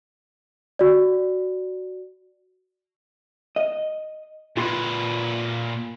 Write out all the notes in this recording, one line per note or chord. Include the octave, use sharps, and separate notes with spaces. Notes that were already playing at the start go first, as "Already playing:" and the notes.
F#4 D5
D#5
A#2 F4 B4 C6